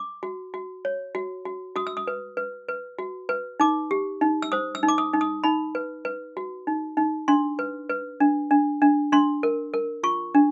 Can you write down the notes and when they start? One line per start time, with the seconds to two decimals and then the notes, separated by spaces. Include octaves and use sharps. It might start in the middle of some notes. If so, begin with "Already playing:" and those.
Already playing: D6
0.23 F#4
0.54 F#4
0.85 C#5
1.15 F#4
1.45 F#4
1.76 F#4 D#6
1.87 E6
1.97 D#6
2.07 B4
2.37 B4
2.68 B4
2.99 F#4
3.29 B4
3.60 D#4 D6
3.91 G4
4.21 D#4
4.42 E6
4.52 C5 D#6
4.75 E6
4.83 D#4
4.88 D6
4.98 D#6
5.14 D#4
5.21 D#6
5.44 D#4 B5
5.75 B4
6.05 B4
6.37 F#4
6.67 D#4
6.97 D#4
7.28 D4 C6
7.59 B4
7.90 B4
8.20 D4
8.51 D4
8.82 D4
9.12 D4 C6
9.43 A#4
9.74 A#4
10.03 F4 C#6
10.35 D4